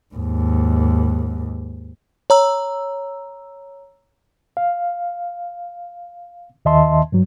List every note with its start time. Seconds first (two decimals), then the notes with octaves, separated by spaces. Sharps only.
0.15 D#2 G#2
2.30 C#5 A#5 E6
4.57 F5
6.65 D#2 D#3 D#5 E5 A5 C6
7.12 G2 F#3